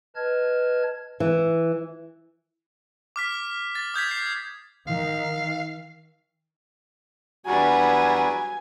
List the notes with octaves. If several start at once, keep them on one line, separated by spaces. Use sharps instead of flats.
B4 D#5 A5 F6 G#6
E3
D6 F6 B6
A6
D#6 G6 G#6 B6
C7
D#3 F5
E2 F#3 G3 D4 F#4 B4 G#5